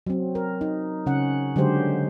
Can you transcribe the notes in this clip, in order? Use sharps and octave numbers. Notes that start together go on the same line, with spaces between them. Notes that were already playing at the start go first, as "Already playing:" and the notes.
F#3 C4
A#4
D#4
C#3 C#4 F#5
D3 F#3 G#3 G4 C5